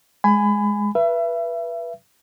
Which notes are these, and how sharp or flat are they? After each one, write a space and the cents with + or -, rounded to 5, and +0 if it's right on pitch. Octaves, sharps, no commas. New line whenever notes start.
G#3 +0 G#5 +0 B5 +25
B4 -20 E5 +30